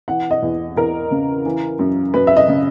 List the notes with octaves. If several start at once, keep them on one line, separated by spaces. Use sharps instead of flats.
E3 F#5
D#5
E2
E2 A#4
C#3
E3
F#2
F#2 B4
E5
D#5
C#3